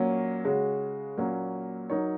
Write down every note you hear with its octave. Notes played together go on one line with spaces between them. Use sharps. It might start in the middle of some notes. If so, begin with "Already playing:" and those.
Already playing: A#2 F#3 A#3 C#4
C#3 G#3 F#4 C#5
A#2 F#3 A#3 C#4
F#3 D#4 A#4 C#5